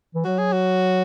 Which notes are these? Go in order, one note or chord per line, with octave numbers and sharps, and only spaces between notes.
E3
F#3 F#4
G#4
F#4